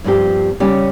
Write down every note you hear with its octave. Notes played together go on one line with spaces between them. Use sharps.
G2 F3 C4 G4
C#3 G3 C#4 G4